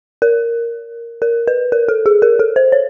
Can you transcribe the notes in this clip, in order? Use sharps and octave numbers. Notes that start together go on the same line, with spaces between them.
A#4
A#4
B4
A#4
A4
G#4
A#4
A4
C5
C#5